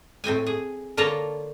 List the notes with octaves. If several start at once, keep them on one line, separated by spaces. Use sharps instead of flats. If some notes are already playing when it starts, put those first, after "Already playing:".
A2 C4 G5 G#5
G#4
D3 A#3 F4 C#5 A5 A#5